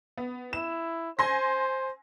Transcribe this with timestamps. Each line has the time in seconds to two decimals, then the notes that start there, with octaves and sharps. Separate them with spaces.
0.18 B3
0.53 E4 E7
1.19 C5 G#5 C6 A#6